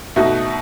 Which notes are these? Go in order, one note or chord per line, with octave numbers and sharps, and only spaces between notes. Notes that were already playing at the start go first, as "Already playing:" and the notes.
B2 A3 D#4 F#4